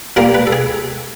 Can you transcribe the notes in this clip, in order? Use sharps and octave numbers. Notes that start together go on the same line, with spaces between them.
A#2 G3 A#3 A#4
B4
A4
G#4